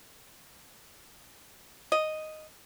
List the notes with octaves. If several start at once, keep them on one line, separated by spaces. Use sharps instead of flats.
D#5